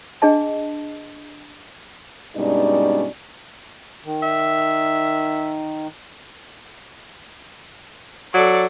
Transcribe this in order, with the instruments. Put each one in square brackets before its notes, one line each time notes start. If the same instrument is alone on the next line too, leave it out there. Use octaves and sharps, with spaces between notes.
[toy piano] D4 G#4 D#5 A5
[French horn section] G2 B2 G#3 C#4 D#4 D5
[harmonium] D#3
[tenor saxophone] E5
[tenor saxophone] F#3 [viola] A4 D5